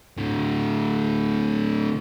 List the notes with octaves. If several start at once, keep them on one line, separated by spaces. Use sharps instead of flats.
A2 D3